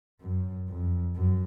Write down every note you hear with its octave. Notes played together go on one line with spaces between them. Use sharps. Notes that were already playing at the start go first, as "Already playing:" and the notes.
F#2
F2
F#2